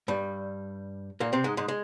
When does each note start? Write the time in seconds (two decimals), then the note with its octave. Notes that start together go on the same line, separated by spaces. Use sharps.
0.08 G2 G3
1.20 A#2 A#3
1.33 C3 C4
1.44 G#2 G#3
1.57 G#2 G#3
1.68 G#3